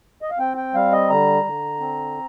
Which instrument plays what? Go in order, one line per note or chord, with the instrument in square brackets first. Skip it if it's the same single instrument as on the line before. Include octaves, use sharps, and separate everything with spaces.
[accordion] D#5
F5
C4 G5
G5
G3 F5
D#5
D3 A#5
D3
C4